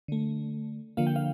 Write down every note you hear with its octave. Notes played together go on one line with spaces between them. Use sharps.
D3 A3
D3 F3 A#3 F5
G5
F5